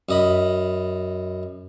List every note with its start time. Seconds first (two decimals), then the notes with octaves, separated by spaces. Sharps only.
0.09 F#2 D#5 B5